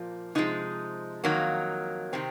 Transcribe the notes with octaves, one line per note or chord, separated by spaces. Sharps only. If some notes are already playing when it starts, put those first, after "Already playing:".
Already playing: A#2 F3 A#3
C3 F3 G#3 D#4
F2 D#3 F#3 A#3
C3 D#3 C4